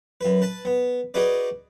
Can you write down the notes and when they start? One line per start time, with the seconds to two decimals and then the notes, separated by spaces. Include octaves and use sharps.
0.21 F#2 B4
0.42 B4 A5
0.65 B3
1.14 D#4 F#4 G#4 B4 D5